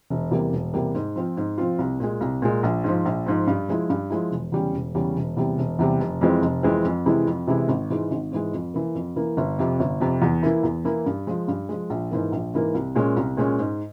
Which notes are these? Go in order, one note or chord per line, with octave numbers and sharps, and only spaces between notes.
E1
E2 C3 G3 A#3
E1
E2 C3 G3 A#3
G#2
F3 C4 F4
G#2
F3 C4 F4
C2
A#2 G#3
C2
A#2 G#3
A#1
G#2 F3
A#1
G#2 F3
G2
F3 G#3 E4
G2
F3 G#3 E4
E1
E2 C#3 G3 C#4
E1
E2 C#3 G3 C#4
E1
E2 C3 G3
E1
E2 C3 G3
F1
F2 E3 G#3 C4
F1
F2 E3 G#3 C4
F2
C3 E3 G#3 E4
F2
C3 E3 G#3 E4
G#1
G#2 E3 G#3
G#1
G#2 E3 G#3
F2
E3 A#3
F2
E3 A#3
G1
F2 C3
G1
F2 C3
E2
E3 A#3 E4
E2
E3 A#3 E4
G2
F3 G#3
G2
F3 G#3
A#1
G#2 E3 A#3
A#1
G#2 E3 A#3
C2
A#2 G#3 C#4
C2
A#2 G#3 C#4
G#2